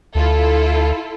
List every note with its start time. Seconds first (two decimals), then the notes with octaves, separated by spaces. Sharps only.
0.15 D2 E4 F4 A4